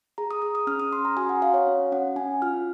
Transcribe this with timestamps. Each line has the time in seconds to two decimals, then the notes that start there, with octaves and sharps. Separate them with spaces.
0.18 G#4 A#5
0.31 D#6
0.42 G#4 D#6
0.55 D#6
0.67 C#4 F6
0.80 D#6
0.92 C#4 C6
1.05 A#5
1.17 F#4 G#5
1.29 F#5
1.42 F#4 F5
1.54 C#5
1.67 C#4
1.92 C#4 F#5
2.16 C#4 G#5
2.42 F4 F6